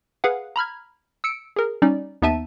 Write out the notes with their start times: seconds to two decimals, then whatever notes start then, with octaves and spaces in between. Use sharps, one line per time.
0.24 G#4 B4 F5 F#5
0.56 A#5 B5 F6 G#6
1.24 E6 C#7 D7
1.56 G#4 A#4
1.82 G3 C#4 D#4 D5
2.22 D#2 B3 D#4 E5 A5 D#7